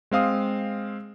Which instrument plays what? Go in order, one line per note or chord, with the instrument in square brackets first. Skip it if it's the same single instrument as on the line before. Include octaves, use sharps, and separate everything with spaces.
[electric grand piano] G#3 C4 F5 D#6